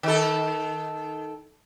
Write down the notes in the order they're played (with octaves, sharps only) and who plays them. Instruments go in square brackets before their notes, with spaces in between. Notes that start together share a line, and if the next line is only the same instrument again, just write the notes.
[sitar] D#3 A4